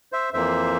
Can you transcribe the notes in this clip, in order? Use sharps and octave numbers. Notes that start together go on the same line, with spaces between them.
C5 E5
F2 E3 A#3 C5 E5